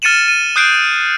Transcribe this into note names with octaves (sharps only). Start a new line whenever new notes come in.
F6 A6 C#7 D#7 E7 F#7
D#7
D#6 F#6 G6 C7 D7